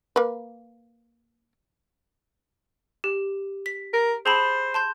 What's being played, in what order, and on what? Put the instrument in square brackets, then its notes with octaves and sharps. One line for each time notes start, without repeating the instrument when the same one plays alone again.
[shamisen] A#3 B4
[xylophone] G4
B6
[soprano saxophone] A#4
[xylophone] G#4 A5 B5 [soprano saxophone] C5
[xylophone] A5 C6 G6